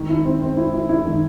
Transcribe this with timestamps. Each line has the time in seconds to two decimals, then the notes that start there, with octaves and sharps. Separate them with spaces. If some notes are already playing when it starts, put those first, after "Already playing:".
Already playing: D#3
0.09 E4
0.25 C4
0.42 C4
0.57 E4
0.73 E4
0.89 E4
1.05 D#3